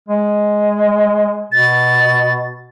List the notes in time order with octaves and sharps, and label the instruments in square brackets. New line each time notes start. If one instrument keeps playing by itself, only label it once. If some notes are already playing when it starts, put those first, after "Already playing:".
[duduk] G#3
[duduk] B2 [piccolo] A6